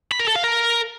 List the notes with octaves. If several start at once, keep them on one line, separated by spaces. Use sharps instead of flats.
B5
A#4
A4
F5
A#4